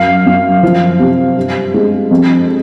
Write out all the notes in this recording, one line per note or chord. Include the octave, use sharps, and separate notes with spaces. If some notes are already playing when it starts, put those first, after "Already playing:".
Already playing: F#2 F5
F#2
F3
C3
G2
G#3
F2